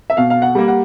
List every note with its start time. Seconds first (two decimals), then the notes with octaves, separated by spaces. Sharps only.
0.10 E5
0.17 B2 F5
0.30 F5
0.42 F#5
0.55 G3 A#3
0.68 F#5